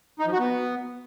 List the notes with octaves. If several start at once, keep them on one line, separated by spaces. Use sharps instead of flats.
D#4
F3
F#4
B3